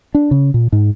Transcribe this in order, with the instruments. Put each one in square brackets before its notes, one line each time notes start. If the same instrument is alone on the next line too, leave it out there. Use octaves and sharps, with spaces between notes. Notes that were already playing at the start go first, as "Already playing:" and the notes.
[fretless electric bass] D4
C#3
A#2
G#2